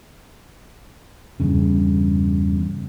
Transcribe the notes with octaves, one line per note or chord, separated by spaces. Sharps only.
E2 G2 C#3